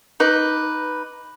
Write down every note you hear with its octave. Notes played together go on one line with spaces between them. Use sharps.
D#4 B4 D6